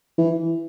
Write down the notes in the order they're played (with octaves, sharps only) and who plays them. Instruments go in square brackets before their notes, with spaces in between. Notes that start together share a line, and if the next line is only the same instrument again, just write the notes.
[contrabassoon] E3